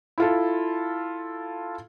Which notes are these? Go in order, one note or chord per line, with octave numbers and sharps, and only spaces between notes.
E4 F4 A4